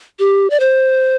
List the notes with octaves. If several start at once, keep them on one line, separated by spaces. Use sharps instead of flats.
G4
D5
C5